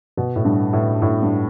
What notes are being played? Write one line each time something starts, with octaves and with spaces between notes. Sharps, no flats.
B2
A2
G2
A2
A2
G2